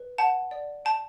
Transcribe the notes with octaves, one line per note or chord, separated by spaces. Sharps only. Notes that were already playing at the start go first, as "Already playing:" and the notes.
Already playing: B4
F#5 A5
D5
G5 A5